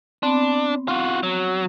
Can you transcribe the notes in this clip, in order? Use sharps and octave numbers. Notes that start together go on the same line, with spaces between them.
B3 C4 D4
F4 F#4
F#3